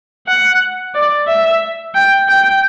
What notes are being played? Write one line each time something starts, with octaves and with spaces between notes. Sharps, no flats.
F#5
D5
E5
G5
G5